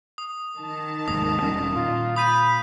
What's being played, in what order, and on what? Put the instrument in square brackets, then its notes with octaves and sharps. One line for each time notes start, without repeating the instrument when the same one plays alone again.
[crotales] D#6
[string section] D#3 A5
[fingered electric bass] F1 D#2 G#2 [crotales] D#6
[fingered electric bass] E1 G3 C#4
[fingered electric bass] A#2 [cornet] F4
[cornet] B5 [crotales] D#6 G6 D#7